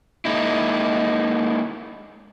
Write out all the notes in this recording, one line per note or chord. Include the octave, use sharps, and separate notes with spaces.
G#3 A#3 D#4 E4